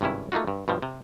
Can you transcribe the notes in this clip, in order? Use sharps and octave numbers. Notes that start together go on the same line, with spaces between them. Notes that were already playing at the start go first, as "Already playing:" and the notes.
G#1 G2 C3 C#4 E4
A3 A#3 D#4 F4 F#4
G2
G2 B2 F3
C3